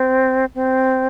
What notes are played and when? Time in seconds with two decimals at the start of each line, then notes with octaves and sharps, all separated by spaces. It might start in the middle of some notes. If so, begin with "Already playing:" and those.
Already playing: C4
0.55 C4